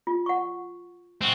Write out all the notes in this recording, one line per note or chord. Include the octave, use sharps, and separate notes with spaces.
F4
F#5 C#6
C4 F#4